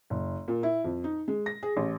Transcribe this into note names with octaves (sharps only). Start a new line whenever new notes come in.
F#1
A#2
E4
F2
D#4
G#3
A#6
G#4
A1